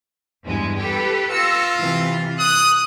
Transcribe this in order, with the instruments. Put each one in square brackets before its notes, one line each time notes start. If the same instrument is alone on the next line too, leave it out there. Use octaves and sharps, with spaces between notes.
[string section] E2 G2 G#3
G4 A4 B4
[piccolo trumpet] F4 [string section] E6 A#6 C#7
[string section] C3 E3
[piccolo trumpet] D#6 [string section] F#6